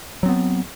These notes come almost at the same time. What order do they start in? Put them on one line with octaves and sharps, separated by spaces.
F#3 C4 B3